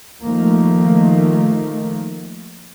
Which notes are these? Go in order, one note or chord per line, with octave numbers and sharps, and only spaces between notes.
D#3 F3 A3 A#3